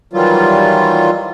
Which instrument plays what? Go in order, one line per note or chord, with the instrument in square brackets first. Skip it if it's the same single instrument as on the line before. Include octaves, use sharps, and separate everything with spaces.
[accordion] D#3 E3 F#3 G3 F4